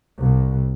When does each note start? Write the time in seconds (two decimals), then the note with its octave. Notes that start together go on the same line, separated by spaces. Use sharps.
0.19 C2